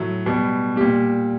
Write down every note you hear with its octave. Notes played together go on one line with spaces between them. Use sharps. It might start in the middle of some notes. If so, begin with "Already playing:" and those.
Already playing: A2 F#3 A3
B2 G3
A#2 G3 G4